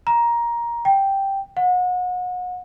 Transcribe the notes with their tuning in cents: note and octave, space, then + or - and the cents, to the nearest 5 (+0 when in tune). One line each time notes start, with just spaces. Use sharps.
A#5 +15
G5 -5
F#5 -35